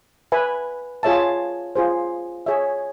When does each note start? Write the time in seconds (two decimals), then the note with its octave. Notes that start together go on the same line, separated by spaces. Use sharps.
0.32 B4 E5 G#5 B5
1.03 F4 G#4 C#5 E5 A5
1.76 F4 G#4 C5
2.46 G#4 C#5 E5